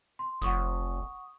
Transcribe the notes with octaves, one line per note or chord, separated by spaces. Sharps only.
C6
F1 F#5 C#6 D#6